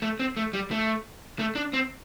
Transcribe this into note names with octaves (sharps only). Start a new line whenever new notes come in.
A3
C4
A3
G3
A3
A3
D4
C4